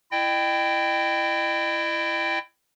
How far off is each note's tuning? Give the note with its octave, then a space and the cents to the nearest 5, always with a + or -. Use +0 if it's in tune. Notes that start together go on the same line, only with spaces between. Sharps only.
E4 +20 D#5 -35 G5 +0